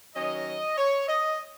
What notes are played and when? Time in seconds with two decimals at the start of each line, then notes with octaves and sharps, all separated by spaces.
0.16 D#3 F#3 C#4 D#5
0.77 C#5
1.08 D#5